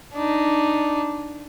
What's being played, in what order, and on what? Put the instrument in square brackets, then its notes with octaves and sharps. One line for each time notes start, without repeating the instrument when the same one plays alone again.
[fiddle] D4 D#4